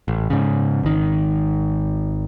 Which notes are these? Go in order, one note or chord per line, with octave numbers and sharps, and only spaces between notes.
A1
G#2 C#3
G#1 D#3